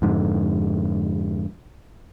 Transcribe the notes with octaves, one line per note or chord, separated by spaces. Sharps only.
F2 G#2 D3